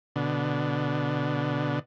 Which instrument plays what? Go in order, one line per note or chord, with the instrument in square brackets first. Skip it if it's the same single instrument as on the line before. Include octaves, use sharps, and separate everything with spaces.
[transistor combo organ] B2 D3